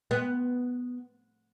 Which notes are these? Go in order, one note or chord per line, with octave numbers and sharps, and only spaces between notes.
B3